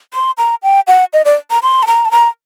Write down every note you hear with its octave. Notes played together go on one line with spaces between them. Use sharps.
C6
A#5
G5
F#5
D#5
D5
A#5
C6
A5
A#5
A5
A#5